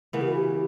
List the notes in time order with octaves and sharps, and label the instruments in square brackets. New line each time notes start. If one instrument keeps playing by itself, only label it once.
[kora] C#3 E3 B3 [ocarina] A#4
[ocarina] G4
F#4
G4